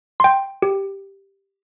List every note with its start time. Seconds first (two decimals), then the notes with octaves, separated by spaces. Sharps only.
0.20 G5 C6
0.62 G4